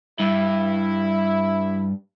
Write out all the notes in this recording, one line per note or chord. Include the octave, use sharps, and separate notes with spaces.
G2 E4